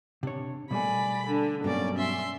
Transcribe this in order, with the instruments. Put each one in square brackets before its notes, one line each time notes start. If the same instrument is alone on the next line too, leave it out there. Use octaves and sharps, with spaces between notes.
[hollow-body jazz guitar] C3 C#5 [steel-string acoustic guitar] D4
[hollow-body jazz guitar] B2 G3 A3 [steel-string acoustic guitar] A#3 G#5 [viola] D5 B5
[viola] D3 [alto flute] D4
[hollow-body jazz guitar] G2 [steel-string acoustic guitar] B2 F#3 [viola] A#3 D5 [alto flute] C#4
[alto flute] C#4 [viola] E5 C6